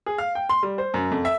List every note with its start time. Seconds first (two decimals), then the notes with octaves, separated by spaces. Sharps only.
0.06 G#4
0.18 F5
0.35 G5
0.49 C6
0.63 G3
0.78 C5
0.94 F#2
1.11 F2
1.25 E5